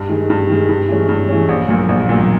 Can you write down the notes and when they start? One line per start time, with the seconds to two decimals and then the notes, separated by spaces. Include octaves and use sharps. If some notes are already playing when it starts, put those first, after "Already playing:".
Already playing: G2
0.09 D#3 G#3
0.30 G2
0.50 D#3 G#3
0.69 G2
0.88 E3 G#3 C#4
1.09 G2
1.29 E3 G#3 C#4
1.49 A#1
1.68 A#2 F#3
1.89 A#1
2.09 A#2 F#3